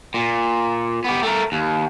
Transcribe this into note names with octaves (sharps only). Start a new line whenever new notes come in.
A#2
B3 G4
A3 A#4
D#2